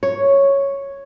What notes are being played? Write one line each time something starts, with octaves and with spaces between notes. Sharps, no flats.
C#5